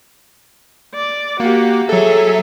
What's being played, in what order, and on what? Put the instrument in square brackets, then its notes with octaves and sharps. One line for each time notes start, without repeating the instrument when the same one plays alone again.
[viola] D5
[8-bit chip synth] A#3 [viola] F#4 G4
[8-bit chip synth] F#3 A4 [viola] G#4 E5